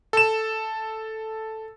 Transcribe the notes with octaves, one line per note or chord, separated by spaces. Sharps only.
A4 E7